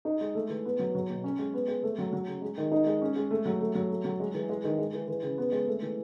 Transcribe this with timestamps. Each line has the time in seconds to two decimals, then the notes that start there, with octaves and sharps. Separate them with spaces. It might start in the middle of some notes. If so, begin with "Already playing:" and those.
0.05 D#4
0.21 G#3
0.35 A3
0.50 E3
0.65 B3
0.79 F#3
0.95 F#3
1.10 B2
1.24 C#4
1.39 G#3
1.54 B3
1.68 G#3
1.83 A3
1.98 F#3
2.13 F#3
2.27 C#3
2.42 G#3
2.58 D#3
2.72 D#4
2.86 G#3
3.01 C#4
3.16 G#3
3.31 A3
3.45 F#3
3.61 A3
3.75 F#3
3.90 A3
4.05 F#3
4.20 G#3
4.34 E3
4.49 G#3
4.64 D#3
4.78 G#3
4.93 E3
5.08 E3
5.23 C#3
5.38 B3
5.52 G#3
5.67 A3
5.82 E3